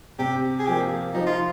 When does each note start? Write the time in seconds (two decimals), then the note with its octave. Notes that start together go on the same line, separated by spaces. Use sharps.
0.19 C3 G4
0.60 G#4
0.66 F3 A#3 G4
1.14 F3 D#4
1.26 F4